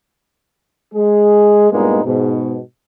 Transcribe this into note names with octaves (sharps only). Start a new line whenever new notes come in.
G#3 G#4
G2 A#2 G#3 A#3 B3 D#4
G#2 B2